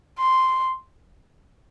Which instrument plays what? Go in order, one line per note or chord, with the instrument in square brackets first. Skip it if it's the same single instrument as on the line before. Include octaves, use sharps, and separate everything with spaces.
[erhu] C6